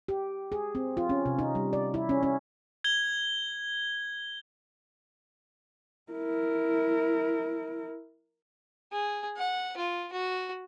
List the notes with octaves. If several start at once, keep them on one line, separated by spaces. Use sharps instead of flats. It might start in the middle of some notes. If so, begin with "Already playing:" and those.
G4
G#4
C4
F4
C#4
C3
D#4
G3
D5
E4
C#4
C#4
G#6 G7
E4 A#4
G#4
F#5
F4
F#4